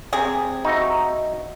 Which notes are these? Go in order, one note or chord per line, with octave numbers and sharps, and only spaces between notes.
C3 G#4
D#4 F#4 E5